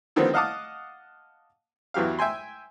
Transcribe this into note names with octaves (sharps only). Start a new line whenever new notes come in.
D3 D#3 F3 G3 B3 C4
D#5 F5 F#5 A5 D6 D#6
E2 E3 F#3 G4 F5
E5 G5 G#5 C6